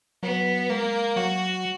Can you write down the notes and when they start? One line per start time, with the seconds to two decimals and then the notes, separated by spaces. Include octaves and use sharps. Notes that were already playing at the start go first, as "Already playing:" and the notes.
0.23 F#3 B3
0.69 G#3 A#3
1.16 F#3 F#4